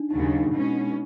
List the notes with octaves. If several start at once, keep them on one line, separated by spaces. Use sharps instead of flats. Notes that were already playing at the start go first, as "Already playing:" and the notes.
Already playing: D4 D#4
D#2 C#3 F#3 D#4
D4
D#4
B2 G#3 C#4